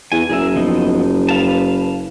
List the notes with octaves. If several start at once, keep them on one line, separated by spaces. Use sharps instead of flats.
E2 G#5
F#1 G#4 A#4 E5
F3 B3 D#4
B4 F5 A5